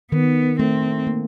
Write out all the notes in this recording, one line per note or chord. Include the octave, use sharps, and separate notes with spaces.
D#3 B3
A3 C4
A#3